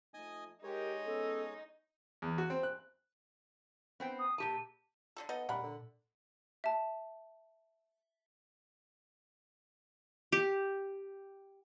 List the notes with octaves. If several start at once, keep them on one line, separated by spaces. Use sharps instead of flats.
F3 A3 D#4 D#5 G#5 D#6
G#3 D#4 G4 A#4 C#5
B3 C#4 A4
E2
F#4
C4
F#6
B3 C4 G5
D#6
A#2 G4 A5 D#7
D3 F#4 A4
B3 D#4 A4 D#5 F#5
A#2 G3 A#4 F#5 B5
D3
E5 A5
G4